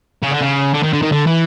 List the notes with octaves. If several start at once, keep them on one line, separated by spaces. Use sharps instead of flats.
C#3
D3
C#3
D3
D#3
D3
D#3
D3
E3